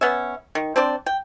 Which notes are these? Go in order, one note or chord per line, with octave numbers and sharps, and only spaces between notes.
B3 C#4 E5
D#3
C4 D4 C5 D5
G5